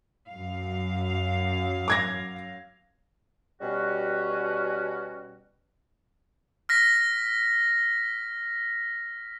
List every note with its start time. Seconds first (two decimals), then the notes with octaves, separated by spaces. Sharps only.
0.28 F#2 F5
1.88 D6 G#6 A#6
3.61 B2 G3 C#4 F#4
6.69 F6 A#6 B6